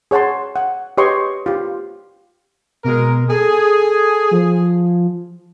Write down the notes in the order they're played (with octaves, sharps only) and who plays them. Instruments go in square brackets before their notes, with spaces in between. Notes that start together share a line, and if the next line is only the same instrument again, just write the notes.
[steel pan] G#4 C#5 F#5 A5 C6
F#5
G4 B4 C#5 D#5 C6 C#6
F4 G4
[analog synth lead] B2 [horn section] G#3 A#4
[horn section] G#4 [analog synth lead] A4
[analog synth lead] F3